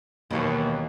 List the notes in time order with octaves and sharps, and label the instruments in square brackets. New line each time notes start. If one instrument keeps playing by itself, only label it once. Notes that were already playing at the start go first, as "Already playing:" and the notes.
[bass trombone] D#2 [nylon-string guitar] B2 A#3 C#5 [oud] D#3 E3 F#3